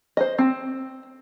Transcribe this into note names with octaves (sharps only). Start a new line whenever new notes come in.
C5 D#5
C4